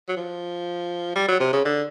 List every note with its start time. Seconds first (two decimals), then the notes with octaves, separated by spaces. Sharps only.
0.09 F#3
0.17 F3
1.16 G3
1.28 F#3
1.40 C3
1.53 C#3
1.65 D3